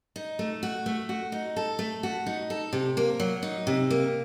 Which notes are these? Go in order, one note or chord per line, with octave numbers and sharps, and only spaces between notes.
D#4
A3
F#4
A3
F#4
D#4
A4
A3
F#4
D#4
A4
C3
A#3
F#3
D#4
C3
A#3